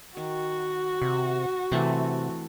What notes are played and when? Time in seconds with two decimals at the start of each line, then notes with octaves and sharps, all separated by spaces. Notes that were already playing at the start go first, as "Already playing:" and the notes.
0.17 D#3 F#4
1.02 C3
1.72 C3 E3 A3 C4